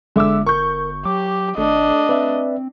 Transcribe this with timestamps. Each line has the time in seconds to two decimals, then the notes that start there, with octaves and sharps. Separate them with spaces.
0.16 G1 D3 G#3 E5 D6 E6
0.46 A#4 C#6 G6
1.05 F#3 G4 D6
1.57 G#1 A3 D4 D#5
2.09 C4 B4 D5 E5